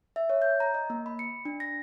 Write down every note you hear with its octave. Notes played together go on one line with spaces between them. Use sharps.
E5
C#5
G6
A#5
D#5
A#3
B5
C#7
D4
A#6